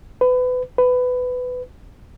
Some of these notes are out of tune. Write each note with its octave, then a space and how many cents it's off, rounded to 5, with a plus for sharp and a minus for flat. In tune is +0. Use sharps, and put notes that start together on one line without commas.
B4 +30
B4 +20